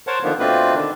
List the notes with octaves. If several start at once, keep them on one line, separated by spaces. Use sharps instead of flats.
A#4 C5 C#5 F#5 A5
D3 D#3 F3 A#3 B3
B2 A3 C4 D4 F4 B4
D3 D#3 D4